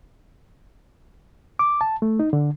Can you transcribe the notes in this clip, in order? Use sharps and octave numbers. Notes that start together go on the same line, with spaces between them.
D6
A5
A3
D#4
D3